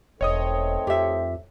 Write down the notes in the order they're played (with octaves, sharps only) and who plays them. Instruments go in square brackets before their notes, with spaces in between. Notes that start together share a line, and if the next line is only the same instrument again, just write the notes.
[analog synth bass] E1 [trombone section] D#3 A3 C4 [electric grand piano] C#5 D#5 D#6
[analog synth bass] F2 [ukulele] G4 E5